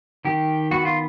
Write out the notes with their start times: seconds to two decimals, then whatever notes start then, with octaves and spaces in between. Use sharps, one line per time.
0.25 D#3 G4
0.71 B3 F#4
0.85 F4